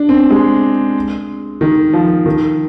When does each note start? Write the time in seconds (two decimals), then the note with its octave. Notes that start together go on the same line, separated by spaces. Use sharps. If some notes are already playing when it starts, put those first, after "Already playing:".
Already playing: D4
0.09 C4
0.30 G#3
1.61 D#3
1.93 F3
2.26 D#3